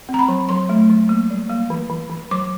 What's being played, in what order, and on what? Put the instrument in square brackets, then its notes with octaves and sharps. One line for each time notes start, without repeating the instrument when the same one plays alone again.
[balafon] C4
A#5
B5
F#3
F#3 C6
A3
F#3
A#3
G3
A#3
E3
E3
E3
F#3 D6